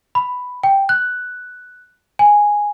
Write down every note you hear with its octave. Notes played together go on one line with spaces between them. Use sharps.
B5
G5
F#6
G#5